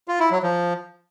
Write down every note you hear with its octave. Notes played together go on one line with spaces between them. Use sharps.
F4
E4
F#3
F3